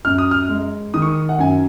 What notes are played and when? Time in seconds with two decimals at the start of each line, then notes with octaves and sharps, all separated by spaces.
0.05 F#2 F6
0.18 D#6
0.31 F6
0.49 G#3
0.94 D#3 D#6
1.02 C#6
1.09 D#6
1.29 F#5
1.39 F#2 G#5